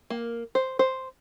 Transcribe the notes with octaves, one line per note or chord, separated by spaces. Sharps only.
A#3
C5
C5